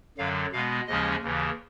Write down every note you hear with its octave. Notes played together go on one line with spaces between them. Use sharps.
F#2 D3 F#3 F5
B2 G#3 B3 F5
D#2 C#3 F3 G#3 C#4 D#5
D#2 C#3 E3